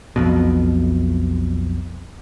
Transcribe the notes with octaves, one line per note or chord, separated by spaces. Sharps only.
B1 F2 B2